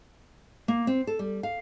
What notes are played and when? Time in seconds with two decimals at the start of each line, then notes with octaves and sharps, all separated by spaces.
0.68 A#3
0.87 C4
1.07 A4
1.19 G3
1.43 F5